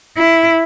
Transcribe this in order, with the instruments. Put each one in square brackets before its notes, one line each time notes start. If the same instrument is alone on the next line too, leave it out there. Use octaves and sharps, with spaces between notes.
[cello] E4